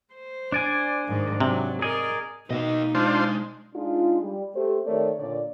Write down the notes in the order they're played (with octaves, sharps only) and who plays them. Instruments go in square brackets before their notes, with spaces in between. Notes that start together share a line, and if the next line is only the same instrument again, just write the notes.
[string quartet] C5
[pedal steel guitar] D4 D5 G#5
[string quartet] G#2 D#3
[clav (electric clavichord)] C3 [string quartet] F#3
[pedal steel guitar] G#4 D#5 [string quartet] A#4 D5
[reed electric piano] B2 [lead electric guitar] A#3 D#5 [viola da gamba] D#4
[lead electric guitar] G#3 [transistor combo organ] D4 F4 C5
[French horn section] G#3 D4 D#4 F4
G3
A3 G4 C5
D#3 A3 C4 A#4 C#5 D5
A#2 D3 C#5 D5